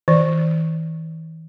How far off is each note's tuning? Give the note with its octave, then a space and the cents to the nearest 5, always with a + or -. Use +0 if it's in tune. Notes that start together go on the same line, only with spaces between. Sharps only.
E3 -40 D5 +0